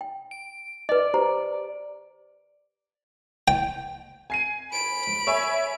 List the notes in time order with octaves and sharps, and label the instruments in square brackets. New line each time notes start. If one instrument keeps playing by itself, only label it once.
[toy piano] G5
[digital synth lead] D7
[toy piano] B4 D#5 [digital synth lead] D5
[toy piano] G4 C5 A#5
[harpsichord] G5
[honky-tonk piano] G#5 C7 D#7
[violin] B5 D7
[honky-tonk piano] C#5 E5 G#5